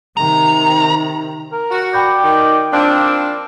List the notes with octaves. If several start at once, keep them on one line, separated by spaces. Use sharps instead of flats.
C3 D#3 A#5
A#4
F#4
D5 G5 B5 G6
D#3
F3 A#3 C4 D4